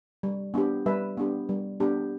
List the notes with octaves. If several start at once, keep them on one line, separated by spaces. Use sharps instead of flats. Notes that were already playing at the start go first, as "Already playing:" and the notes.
G3
B3 D4 G4
G3 B4 E5
B3 D4 G4
G3
B3 D4 G4